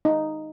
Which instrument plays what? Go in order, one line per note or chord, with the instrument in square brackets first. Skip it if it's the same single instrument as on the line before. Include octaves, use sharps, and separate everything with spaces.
[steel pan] D#4